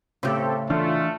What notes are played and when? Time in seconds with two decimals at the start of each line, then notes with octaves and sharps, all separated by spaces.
0.23 A2 C#3 C4 G4 A4
0.70 E3 A3 D4 F4